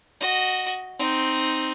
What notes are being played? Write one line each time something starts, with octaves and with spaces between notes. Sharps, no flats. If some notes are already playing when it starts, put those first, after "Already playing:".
F#4 D#5
C4 D#4